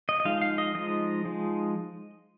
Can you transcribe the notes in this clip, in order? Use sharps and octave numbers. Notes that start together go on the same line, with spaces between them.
D#5
D#5
F3 G#3 D#4 F5
F5
D#5
F3 G#3 D#4 D#5
F3 G#3 D#4